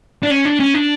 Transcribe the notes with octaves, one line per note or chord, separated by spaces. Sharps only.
D4
C#4
D4
C#4
D4